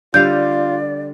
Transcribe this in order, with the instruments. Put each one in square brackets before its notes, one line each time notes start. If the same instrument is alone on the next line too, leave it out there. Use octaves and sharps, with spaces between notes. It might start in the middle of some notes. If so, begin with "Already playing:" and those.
[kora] D3 G3 F5 [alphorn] F4 [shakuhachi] D5 [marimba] G6